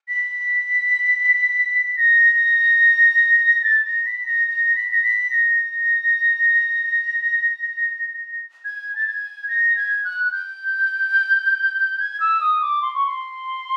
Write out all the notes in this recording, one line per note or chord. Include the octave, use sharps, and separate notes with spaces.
B6
A#6
A6
A#6
B6
A#6
A#6
B6
A#6
B6
A#6
G#6
A6
G#6
A#6
G#6
F#6
F#6
G6
G#6
E6
D#6
D6
C6
C#6
C6